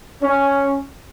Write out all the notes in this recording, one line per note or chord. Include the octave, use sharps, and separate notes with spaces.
C#4